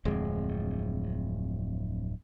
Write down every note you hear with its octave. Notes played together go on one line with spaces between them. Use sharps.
D1 F2 G#3